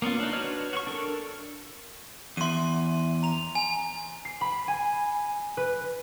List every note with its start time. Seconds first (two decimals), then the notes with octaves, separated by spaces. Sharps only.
0.02 A#3 B3 C#4 F4
0.20 D4 D#4
0.33 D4 F#4 B4 C#5 F6
0.73 F#4 C#6
0.87 D4 A4 A#4
2.37 E2 E5 C6 D#7
3.23 A#5 F7
3.55 G#5
4.25 C7
4.41 B5
4.68 G#5
5.57 B4